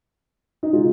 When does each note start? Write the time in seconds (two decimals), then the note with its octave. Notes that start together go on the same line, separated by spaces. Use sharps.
0.63 D#4
0.73 C#3 G#3 F4